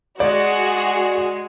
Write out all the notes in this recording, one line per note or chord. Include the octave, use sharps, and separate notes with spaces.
G#3 F#4 G#4 D5